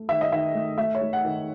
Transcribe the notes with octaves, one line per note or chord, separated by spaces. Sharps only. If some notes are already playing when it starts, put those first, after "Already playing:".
Already playing: A3
D#3 E5
D#5
D#3 E5
A3
A3 E5
C#5
A3
F#5
D#3